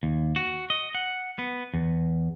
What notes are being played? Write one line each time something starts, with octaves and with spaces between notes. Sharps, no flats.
D#2
F#4
D#5
F#5
B3
E2